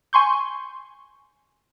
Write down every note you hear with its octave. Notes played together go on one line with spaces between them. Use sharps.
G#5 C6 C#6 G6